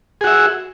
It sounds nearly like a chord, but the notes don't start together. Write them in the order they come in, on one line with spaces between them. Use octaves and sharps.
G#4 F#4 E5